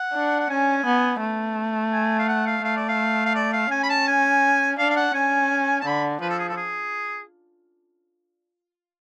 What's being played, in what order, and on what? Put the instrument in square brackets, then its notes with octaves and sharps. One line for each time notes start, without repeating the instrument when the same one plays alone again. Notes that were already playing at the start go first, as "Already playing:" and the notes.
Already playing: [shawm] F#5
[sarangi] D4
[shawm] F#5
[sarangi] C#4 [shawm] G#5
[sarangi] B3
A3
[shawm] G#5
F5
F#5
F5
[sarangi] A3 [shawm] F5
[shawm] D5
F5
F5
D5
F5
[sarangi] C#4 [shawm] G#5
[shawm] B5
A5
G#5
[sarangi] D4 [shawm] F5
[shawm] F5
F#5
[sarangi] C#4 [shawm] G#5
[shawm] A5
[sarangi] D3 [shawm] B5
[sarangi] F3 [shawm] B4
[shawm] A4
G#4
A4
G#4